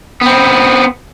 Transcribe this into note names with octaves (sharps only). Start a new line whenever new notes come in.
B3 C4